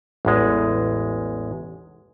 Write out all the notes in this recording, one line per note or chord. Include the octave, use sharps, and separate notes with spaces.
A1 E2 G#3